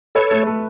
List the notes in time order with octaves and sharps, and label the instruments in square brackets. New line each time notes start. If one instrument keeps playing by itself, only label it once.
[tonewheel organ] A4 C#5 [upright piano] B4
[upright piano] A3
A3